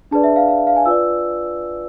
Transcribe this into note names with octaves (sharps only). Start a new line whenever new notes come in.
D4 G#4 B4 D5 A5
E5
F5
F5
E5
F5
G#5
F4 B4 D5 E6